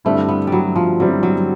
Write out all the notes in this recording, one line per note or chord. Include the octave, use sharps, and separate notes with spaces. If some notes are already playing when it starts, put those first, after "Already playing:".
G2 D3 G3 A3 C4 E4
B3
G3
F#3
F3
G2 D3 F#3 G3 C4 E4
F#3